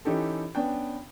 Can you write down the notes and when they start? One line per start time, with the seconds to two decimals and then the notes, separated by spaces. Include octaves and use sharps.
0.05 E3 C#4 D#4 G4 A4
0.55 B3 C#4 D4 G5